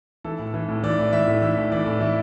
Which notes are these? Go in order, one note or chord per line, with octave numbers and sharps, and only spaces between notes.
E3 A4
A2
E3
A2
E3 D5
A2
E3 E5
A2
E3 E5
A2
E3 D5
A2
E3 E4